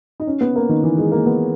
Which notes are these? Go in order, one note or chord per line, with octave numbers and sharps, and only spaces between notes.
D#4
C#4
B3
A#3
D#3
E3
G#3
A#3
B3